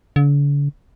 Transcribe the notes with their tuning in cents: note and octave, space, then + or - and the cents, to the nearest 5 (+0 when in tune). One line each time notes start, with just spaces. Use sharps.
D3 -45